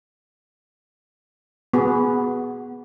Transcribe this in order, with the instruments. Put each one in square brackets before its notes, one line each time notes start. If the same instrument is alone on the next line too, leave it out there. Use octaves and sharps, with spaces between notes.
[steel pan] B3 F#4 G#4